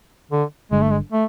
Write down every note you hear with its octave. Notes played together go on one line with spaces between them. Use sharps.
D3
G1 G2 D3 G#3
A3
G#3
A3